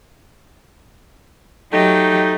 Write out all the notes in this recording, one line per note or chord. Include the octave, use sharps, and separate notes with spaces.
F#3 A3 D#4 G4